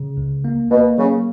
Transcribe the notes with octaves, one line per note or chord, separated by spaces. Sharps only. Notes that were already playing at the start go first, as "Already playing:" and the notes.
Already playing: C#3
C#2
A#3
B2 A#3
C#3 F#3